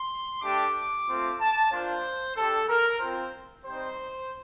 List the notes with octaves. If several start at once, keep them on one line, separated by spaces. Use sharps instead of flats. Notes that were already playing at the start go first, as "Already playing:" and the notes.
Already playing: C6
A3 D4 G4 D6
A3 C4 F4
A5
A#3 D4 F4 C5
G3 D4 G4 A4
A#4
C4 F4 C5
G3 C4 D#4 C5